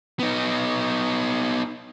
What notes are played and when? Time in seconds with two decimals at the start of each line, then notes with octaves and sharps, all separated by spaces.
0.19 B3 D#4